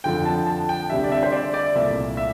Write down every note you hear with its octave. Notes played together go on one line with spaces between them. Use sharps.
F2 D3 F3 G5
A5
A5
G5
D2 C3 G3 D4 E5
D5
E5
C5
D5
D5
C2 A#2 A3 E5
E5